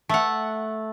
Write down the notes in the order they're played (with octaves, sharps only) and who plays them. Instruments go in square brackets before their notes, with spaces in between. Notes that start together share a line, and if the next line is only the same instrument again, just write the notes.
[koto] A3 F#5